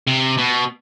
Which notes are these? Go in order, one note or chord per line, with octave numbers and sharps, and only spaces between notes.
C3
B2